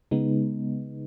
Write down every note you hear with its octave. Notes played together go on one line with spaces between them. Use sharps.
C#3 G#3 B3 D#4